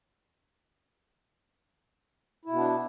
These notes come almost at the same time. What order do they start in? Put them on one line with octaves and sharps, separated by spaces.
E4 B2 B3 D4